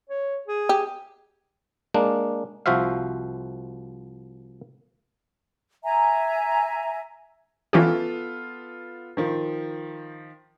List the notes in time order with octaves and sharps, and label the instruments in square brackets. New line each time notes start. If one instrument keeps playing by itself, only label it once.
[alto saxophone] C#5
G#4
[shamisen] G4
[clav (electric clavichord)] G#3 A#3 D4
C2 F3 F#4 C5 E5 F5
[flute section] E5 G#5 A#5
[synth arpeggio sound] E3 C#4 G4 [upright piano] B3 F4 A4
[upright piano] D#3 F3